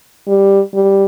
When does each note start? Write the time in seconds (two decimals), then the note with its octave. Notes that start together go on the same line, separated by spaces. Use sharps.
0.27 G3
0.74 G3